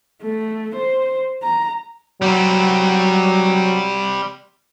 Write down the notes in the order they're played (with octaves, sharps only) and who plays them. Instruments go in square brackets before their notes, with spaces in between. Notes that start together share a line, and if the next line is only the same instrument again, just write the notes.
[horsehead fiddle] A3
C5
A#5
[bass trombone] F#3 [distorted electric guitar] G3 C4